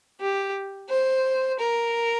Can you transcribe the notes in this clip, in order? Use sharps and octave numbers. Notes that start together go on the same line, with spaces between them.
G4
C5
A#4